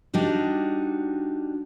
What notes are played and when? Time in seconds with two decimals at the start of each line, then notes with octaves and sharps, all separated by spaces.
0.13 G3 D4 D#4 F#4